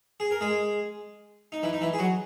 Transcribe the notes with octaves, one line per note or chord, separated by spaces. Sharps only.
G#4
A#4
G#3 G#4
D#4
E3 E4
D#4
E3 E4
G#4
F#3 F#4